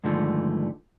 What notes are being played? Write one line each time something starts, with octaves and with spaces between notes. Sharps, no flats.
G2 D3 D#3 F3 G#3 A3